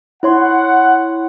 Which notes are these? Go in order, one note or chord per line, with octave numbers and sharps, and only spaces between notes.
E4 C#5 F#5 C6